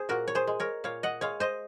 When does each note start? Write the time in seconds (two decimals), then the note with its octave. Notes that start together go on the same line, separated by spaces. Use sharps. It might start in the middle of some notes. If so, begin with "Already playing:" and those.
Already playing: G#4 C5
0.09 A#2 F#4 A#4
0.28 C#5
0.35 G#4 C5
0.47 G#3
0.60 A#4 C#5
0.84 A#2 C#5 F5
1.03 D#5 F#5
1.21 G#3 C#5 F5
1.40 C5 D#5